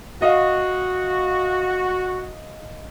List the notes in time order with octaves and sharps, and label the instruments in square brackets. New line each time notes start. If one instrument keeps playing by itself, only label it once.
[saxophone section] F#4 [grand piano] D#5 F5